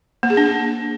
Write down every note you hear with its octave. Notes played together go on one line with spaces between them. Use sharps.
A#3
G#4
D4